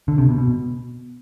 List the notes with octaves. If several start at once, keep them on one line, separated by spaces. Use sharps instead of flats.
D3
C3
B2
B2